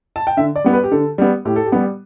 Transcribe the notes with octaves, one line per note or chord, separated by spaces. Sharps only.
A5
G5
D3 E5
D5
G3 B3
B4
G4
D3 A4
G3 B3
A2 G4
A4
G4
G3 B3